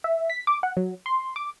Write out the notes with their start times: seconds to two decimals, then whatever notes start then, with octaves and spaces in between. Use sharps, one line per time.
0.04 E5
0.30 B6
0.47 D6
0.63 F#5
0.77 F#3
1.06 C6
1.36 D6